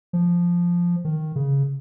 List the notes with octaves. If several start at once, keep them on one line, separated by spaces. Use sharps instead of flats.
F3
D#3
C#3